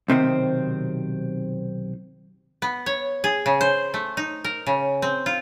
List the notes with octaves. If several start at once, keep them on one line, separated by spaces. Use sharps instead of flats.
B1 C3 D#3 C4
B3
C#5
G#4
C#3
C5
A3
D#4
A#4
C#3
C4
F4